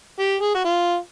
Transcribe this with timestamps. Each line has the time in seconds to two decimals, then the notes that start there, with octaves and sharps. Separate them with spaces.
0.19 G4
0.41 G#4
0.54 F#4
0.64 F4